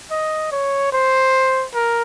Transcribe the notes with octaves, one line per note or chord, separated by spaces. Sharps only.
D#5
C#5
C5
A#4